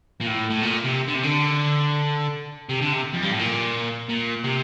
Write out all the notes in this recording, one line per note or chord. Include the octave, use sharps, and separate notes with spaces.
A#2
A2
A2
A#2
C3
D3
C3
D3
C3
D3
C3
F2
G2
A2
A#2
A#2
C3